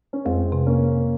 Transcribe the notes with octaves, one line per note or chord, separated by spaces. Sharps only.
C#4
F2 G#3 C4
C3
A#3 C#4